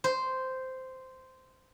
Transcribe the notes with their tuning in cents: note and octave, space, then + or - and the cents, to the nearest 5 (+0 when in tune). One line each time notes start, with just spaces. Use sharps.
C5 -10